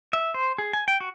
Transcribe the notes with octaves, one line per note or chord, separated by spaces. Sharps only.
E5
C5
G#4
G#5
G5
F#4